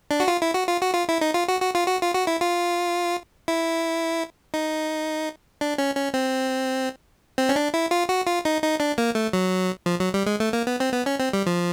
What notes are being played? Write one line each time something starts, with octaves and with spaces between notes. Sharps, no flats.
D4
F#4
F4
E4
F#4
F4
F#4
F4
E4
D#4
F4
F#4
F#4
F4
F#4
F4
F#4
E4
F4
E4
D#4
D4
C#4
C#4
C4
C4
C#4
D4
E4
F4
F#4
F4
D#4
D#4
D4
A#3
A3
F#3
F3
F#3
G3
G#3
A3
A#3
B3
C4
B3
C#4
C4
G3
F3